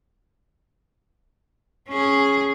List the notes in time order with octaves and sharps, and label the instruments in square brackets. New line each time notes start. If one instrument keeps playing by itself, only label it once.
[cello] C#4 G#4